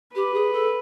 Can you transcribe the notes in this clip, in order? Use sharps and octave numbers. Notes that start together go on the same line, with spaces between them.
G4 B4
G#4
A4